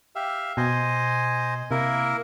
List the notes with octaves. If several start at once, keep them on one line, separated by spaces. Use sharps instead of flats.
G4 E5 F5
B2 C5 D#5 G#5
C3 A#3 E4 A#4